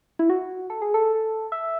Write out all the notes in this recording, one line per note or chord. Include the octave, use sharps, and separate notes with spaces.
E4
F#4
A4
G#4
A4
E5